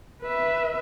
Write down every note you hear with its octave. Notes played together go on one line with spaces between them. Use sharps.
B4 E5